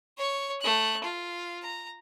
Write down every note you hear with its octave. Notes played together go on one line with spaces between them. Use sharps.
C#5 C#6
A3 F#6
F4
A#5